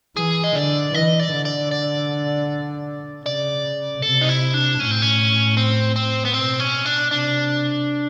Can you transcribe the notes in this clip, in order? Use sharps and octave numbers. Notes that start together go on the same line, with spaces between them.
E3 G#4
D#5
D3 D5
E3 D#5
D5
D3
D5
D5
C#3 D5
C3 A4
D#4
E4
D4
A2 C#4
C4
C#4
C4
C4
B3
B2 C4
C#4
D4
C3 D4